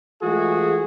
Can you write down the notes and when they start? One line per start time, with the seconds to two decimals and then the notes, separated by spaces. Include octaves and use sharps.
0.22 E3 G#3 A3 F4 F#4 G#4